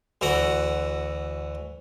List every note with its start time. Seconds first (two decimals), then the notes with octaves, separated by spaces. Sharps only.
0.21 D2 E3 F#4 F#5